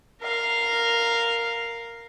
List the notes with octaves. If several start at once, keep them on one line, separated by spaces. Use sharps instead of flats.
A#4 F5